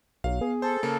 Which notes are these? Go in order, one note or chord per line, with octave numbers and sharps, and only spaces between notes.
B1 F#3 F5
B3 G#4
A4 C5
C#3 A#3